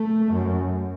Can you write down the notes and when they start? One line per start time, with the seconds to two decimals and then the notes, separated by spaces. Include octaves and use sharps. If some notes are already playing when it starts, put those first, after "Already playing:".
Already playing: A3
0.32 F#2